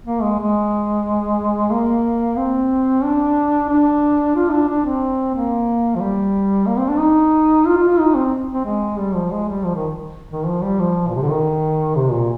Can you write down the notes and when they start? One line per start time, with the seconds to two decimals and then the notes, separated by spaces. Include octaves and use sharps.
0.06 A#3
0.22 G#3
0.39 G#3
1.71 A#3
2.37 C4
3.03 D4
3.69 D4
4.36 F4
4.52 D4
4.68 D4
4.85 C4
5.34 A#3
5.95 F3
6.00 G3
6.67 A#3
6.78 C4
6.89 D4
6.99 D#4
7.66 F4
7.77 F4
7.87 F4
7.99 D#4
8.15 C4
8.54 C4
8.65 G#3
8.98 G3
9.15 F3
9.31 G#3
9.48 G3
9.64 F3
9.75 D#3
10.30 D#3
10.46 F3
10.63 G3
10.79 F3
11.08 A#2
11.15 C3
11.22 D3
11.29 D#3
11.95 C3
12.12 A#2